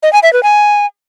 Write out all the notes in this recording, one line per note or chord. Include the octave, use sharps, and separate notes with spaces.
D#5
G#5
E5
B4
G#5